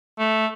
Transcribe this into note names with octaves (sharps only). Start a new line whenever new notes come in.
A3